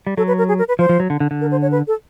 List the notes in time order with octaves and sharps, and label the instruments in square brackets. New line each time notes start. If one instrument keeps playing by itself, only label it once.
[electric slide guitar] G3
[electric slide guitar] F#3 [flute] A4
[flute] B4
A#4
G#4
A#4
B4
[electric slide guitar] F3 [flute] C5
[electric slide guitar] F3
F#3
D3
D3
D3
[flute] A#4
C5
C#5
B4
A4